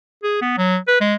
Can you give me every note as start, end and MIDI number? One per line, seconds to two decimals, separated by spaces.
0.23 0.37 68
0.41 0.57 59
0.57 0.76 54
0.88 0.97 71
1.01 1.14 56